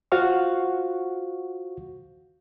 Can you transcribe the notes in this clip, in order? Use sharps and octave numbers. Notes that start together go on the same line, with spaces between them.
F4 F#4 C5 F5 F#5 C#6